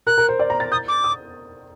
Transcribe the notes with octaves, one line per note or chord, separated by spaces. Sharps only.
A#4 F#6
A#4
C5
D5
A#5
A6
D#6 G6
D6
D#6